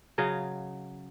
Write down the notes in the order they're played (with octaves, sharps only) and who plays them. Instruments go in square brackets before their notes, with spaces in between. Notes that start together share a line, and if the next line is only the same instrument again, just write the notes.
[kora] C#3 F#3 D#5 F5